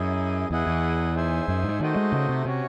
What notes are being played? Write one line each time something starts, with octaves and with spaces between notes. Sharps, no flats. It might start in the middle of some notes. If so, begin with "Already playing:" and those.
Already playing: F#2 E4 G#4 D#5
E2 E4 G#4 D#5 F#5
E2
D#4 G#4 C5 E5 G#5
F#2
G#2
D#3 A3 D#4 F#4 C5 D#5
G#3
C#3
C3
C3 C#4 F#4 C#5